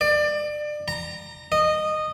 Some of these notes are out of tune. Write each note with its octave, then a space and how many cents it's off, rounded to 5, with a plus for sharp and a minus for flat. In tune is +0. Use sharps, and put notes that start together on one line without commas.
D5 +25
A#5 -20
D#5 -15